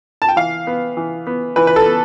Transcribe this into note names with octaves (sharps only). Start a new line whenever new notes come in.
A5
G5
E3 F5
B3
E3
B3
E3 B4
B4
A4
B3